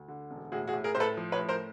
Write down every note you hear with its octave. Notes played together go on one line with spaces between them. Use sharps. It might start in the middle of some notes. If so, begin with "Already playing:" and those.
Already playing: D2
D3
E1
A2 F#4 G#4
F#4 G#4
A2
G#4 A#4
A2 C5
A4 B4
F3
B4 C#5
A2
A#4 C5